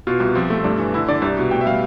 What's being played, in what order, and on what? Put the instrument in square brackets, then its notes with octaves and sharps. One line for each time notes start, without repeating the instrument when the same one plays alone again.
[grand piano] B2 F4
C2
F3 C4
A3
G2 D4
E3
D3 E4
D3 D5
C2
B2
A2 G5
E5
G3 F5